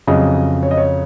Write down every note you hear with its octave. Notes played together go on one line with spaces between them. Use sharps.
F2 C#3 F#3 D#5
C#5
D#5
C#5